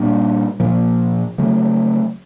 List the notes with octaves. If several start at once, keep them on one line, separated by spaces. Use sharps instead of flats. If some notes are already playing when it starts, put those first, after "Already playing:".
Already playing: A#2 G3 A#3 D4
A#2 F3 A#3
C#3 F#3 A3